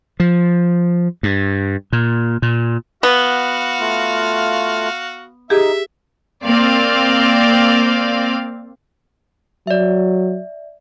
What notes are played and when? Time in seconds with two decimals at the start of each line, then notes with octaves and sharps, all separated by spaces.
0.20 F3
1.23 G2
1.93 A#2
2.42 A#2
3.03 B3 F#4 F5
3.80 A3 F4
5.50 D#4 G4 G#4 E5
6.44 A#3 C4 D5 F5
9.67 F#3 D5 E5